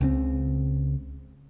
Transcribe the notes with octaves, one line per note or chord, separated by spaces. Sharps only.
C#2 C#3 C4